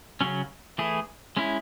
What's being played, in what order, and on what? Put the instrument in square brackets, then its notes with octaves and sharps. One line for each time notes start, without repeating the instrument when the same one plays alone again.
[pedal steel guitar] C#3 F#3 C#4
E3 A3 E4 G#4
G#3 C#4 E4